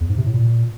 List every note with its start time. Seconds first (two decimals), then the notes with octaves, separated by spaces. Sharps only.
0.01 E2
0.09 G#2
0.17 C3
0.26 A2
0.34 A#2